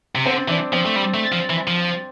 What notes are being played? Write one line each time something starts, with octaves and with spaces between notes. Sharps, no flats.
C3
D3 C4
E3 D4
F3 C4
A3
G3
A3
F3
E3
F3